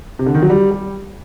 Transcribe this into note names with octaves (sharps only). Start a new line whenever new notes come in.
C3
D3
D#3
F#3
G3
G3